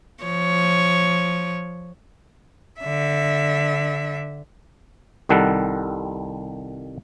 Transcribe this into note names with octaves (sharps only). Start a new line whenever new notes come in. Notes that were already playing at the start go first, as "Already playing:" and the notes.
F3 C#5
D3 E5
C2 D#3 G3 A4 F#5